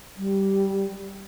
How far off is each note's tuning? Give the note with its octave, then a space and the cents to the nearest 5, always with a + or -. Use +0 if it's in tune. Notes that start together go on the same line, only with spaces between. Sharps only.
G3 -10